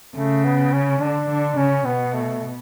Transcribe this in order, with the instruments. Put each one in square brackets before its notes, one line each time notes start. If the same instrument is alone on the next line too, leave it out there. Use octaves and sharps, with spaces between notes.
[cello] C#3 [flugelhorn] A3
[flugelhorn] B3
C#4
[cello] D3 [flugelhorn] D4
[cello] D3
[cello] C#3 [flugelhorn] C#4
[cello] B2 [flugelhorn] B3
[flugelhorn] A3